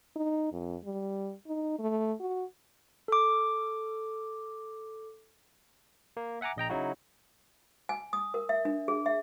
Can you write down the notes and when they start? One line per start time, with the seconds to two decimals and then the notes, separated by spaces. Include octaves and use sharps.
0.16 D#4
0.52 F2
0.84 G3
1.47 D#4
1.79 A3
2.20 F#4
3.08 A4 D6
6.17 A#3
6.41 E5 F#5 G#5 A#5 D6
6.56 A#1 D#5 G5 A#5
6.69 C#3 F#3 D#4 E4 F#4
7.89 G#5
8.13 D#6
8.34 A#4
8.49 E5
8.65 D4
8.88 G#4
9.06 E5